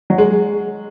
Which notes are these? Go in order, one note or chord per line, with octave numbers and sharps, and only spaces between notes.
F#3
G#3